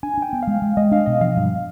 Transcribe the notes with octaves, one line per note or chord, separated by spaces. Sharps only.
D4 G#5
D4 G5
B3
G#3 F5
G#3
G#3 D#5
D4 F5
B2 D#5
F3 F5
G2